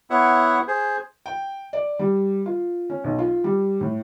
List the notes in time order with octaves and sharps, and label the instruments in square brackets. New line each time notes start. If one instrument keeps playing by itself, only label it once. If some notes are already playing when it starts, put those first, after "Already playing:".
[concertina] B3 E4 C#5 E5 F#5
G#4 C5
[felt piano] G5
D5
G3
F4
C#4
B1
F4
G3
A2